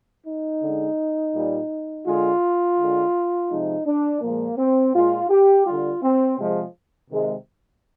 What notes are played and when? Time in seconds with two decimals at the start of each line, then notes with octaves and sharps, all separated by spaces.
0.27 D#4
0.62 D3 G#3
1.34 A#2 G3
2.06 D3 G#3 F4
2.78 D3 G#3
3.50 C3 F3 G#3 D#4
3.86 D4
4.22 A#2 F3 G#3 A#3
4.57 C4
4.94 A#2 G#3 F4
5.29 G4
5.65 D3 G3 F4
6.02 C4
6.38 C3 F3 G#3
7.10 C3 D#3 G#3